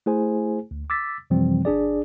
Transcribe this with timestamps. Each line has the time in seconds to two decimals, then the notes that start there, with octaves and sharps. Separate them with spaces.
0.06 A3 E4 G#4 C5 G#5
0.71 D2
0.90 D6 E6 A6 B6
1.30 F#2 C3 E3 F3 G3 C4
1.65 G1 D4 G#4 D5